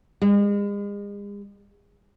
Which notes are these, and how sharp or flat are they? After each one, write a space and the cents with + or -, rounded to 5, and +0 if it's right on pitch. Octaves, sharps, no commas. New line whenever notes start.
G#3 -40